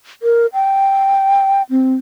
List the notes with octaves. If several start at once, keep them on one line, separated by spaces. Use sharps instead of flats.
A#4
G5
C4